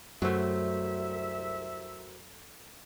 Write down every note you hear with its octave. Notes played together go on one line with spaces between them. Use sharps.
C2 F#2 F#3 A3 F#4 A#4 C5 E5